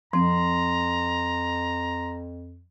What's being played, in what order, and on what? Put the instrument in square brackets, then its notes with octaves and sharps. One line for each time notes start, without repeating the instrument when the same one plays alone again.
[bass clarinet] F2 [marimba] F3 C4 [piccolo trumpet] A#5 [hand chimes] C6